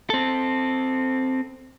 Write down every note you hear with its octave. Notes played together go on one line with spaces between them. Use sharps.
C4 A4